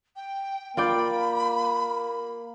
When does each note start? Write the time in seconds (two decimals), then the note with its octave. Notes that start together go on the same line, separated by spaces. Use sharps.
0.16 G5
0.77 A#3 F4 D5 G5 B5